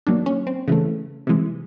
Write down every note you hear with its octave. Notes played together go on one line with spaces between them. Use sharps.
D#3 F#3 A#3 D4
C#4
C4
C#3 E3 A3
C3 E3 G#3